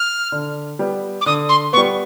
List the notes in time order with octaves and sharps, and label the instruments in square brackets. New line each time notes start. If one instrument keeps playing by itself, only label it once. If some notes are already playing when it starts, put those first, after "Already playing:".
Already playing: [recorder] F6
[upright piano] D3
G3 B3
[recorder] D6
[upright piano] D3 [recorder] D#6
[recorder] C6
[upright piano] B3 [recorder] C#6
[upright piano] G3